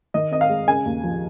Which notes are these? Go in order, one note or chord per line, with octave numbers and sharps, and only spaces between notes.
D#3 D#5
C4 D#5
F5
G#3
C#3 G#5
D#2
F3